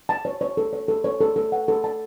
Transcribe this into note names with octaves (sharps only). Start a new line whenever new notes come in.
A5
C#5
C#5
A4
C#5
A4
C#5
A4
A4
F#5
A4
A5